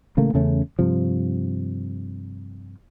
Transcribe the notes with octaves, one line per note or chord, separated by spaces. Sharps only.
A1 C#3 A3 A#3
E2 C#3 A3 C#4
G2 C3 F3